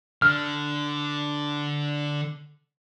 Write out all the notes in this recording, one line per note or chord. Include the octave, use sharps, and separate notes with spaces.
D3 F6